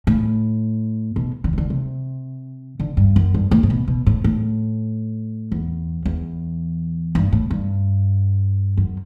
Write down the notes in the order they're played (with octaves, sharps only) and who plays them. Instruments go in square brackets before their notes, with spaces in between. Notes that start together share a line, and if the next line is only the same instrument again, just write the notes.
[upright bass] A2
B2
D3
E3
D3
C3
D3
G2
F#2
G2
A2
A2
B2
B2
A2
A2
E2
E2
G2
A2
G2
F#2